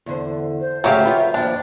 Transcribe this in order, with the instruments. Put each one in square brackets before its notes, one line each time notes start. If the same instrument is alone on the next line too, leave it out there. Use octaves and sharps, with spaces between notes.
[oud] E2 D3 C5
[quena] C5
[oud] D2 C#3 A3 [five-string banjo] F#3 G4 F5 [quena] E5
[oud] F4 B4
[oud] D#2 F3 [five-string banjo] D4 [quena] G5